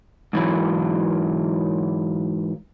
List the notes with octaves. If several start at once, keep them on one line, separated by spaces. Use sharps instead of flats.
G#2 E3 F#3